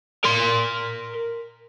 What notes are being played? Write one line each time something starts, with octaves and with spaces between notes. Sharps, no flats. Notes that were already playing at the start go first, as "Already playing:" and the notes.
A#4 C6